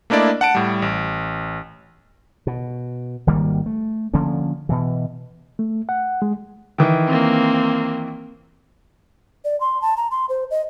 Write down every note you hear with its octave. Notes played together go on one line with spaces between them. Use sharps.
A3 A#3 D4 E4 D5 D#5
F#5 A5 D7
A2 G3
A1
B2
G#1 D#3 G3 A#3
A3
D3 F3 A#3 C#4
B2 E3
A3
F#5
G#3
D#3 E3
A#3 C4
D5
C6
A5
A#5
C6
C5
D#5